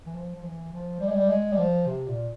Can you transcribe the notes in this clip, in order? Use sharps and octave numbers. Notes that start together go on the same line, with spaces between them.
E3
F3
F3
E3
F3
G3
G#3
G3
G#3
G3
F3
C3
A#2